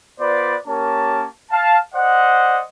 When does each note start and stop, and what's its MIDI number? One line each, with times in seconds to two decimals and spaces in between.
0.20 0.55 59
0.20 0.55 65
0.20 0.55 71
0.20 0.55 72
0.20 0.55 74
0.67 1.26 58
0.67 1.26 61
0.67 1.26 67
0.67 1.26 70
0.67 1.26 73
0.67 1.26 81
1.51 1.78 77
1.51 1.78 81
1.95 2.62 72
1.95 2.62 74
1.95 2.62 75
1.95 2.62 78